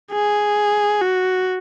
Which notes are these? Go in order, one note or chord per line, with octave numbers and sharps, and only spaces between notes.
G#4
F#4